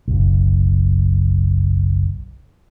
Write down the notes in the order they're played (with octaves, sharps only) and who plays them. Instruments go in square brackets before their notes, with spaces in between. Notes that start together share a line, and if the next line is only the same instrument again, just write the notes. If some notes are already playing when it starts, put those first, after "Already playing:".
[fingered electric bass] F#1 B1